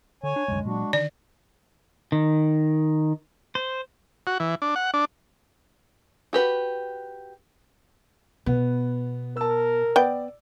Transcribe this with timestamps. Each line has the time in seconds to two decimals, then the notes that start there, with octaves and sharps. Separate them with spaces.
0.23 D3 C#5 G#5
0.36 D4
0.48 C2 F#2 D3 G#3
0.65 A#2 F#3 D4 F#4
0.93 D3 D#3 D5
2.12 D#3
3.55 C5
4.27 F#4
4.40 E3
4.62 D4
4.76 F#5
4.94 D4
6.33 F#4 G4 B4
8.46 B2 B3
9.37 A#4 A5 E6
9.96 B3 D5 G5